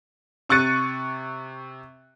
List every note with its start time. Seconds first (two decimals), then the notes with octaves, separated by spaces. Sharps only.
0.49 C3 C#6 F#6 A6 C#7 D#7